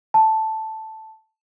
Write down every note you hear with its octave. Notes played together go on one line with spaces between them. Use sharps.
A5